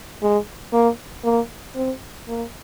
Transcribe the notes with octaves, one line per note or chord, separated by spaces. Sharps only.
G#3
A#3
A#3
C4
A#3